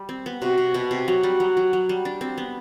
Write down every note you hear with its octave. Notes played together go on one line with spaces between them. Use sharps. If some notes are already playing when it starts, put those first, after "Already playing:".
Already playing: G3
C4
B3
C3 F#4
C3
B2
C3
F#3 F#4
G3
F#3
F#3
F#3
G3
D4
C4
B3